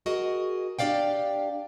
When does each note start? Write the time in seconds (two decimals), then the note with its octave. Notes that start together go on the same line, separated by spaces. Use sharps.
0.06 F#4 G#4 A#4 D#5
0.79 D4 G4 D5 F5 G5